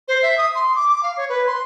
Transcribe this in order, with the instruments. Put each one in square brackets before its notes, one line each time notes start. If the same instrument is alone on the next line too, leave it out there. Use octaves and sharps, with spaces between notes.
[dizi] C5
E5
D#6
C6
D6
D6
F5
C#5
B4
C6